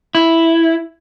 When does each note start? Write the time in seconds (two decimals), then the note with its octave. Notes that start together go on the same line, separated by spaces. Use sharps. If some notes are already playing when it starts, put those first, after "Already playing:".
0.15 E4